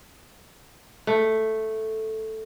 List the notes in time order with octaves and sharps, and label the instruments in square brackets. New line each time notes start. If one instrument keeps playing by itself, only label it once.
[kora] A3